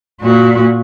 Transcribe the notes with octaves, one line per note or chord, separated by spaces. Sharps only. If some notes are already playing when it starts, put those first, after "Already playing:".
A#2 F#4